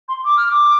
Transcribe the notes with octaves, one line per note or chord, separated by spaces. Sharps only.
C6
D6
F6
D6